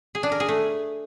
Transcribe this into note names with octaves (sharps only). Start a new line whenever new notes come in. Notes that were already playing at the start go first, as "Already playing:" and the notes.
G#4
D4
A#4
G#4
A3